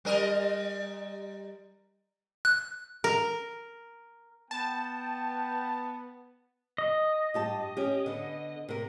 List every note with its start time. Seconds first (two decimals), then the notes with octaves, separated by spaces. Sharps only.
0.05 G3 A#4 D#5
2.45 F#6
3.04 A#4
4.51 B3 G5 A5
6.78 D#5
7.34 G2 G4 A5
7.77 C#4 G4
8.06 D3 B3
8.69 C3 A#4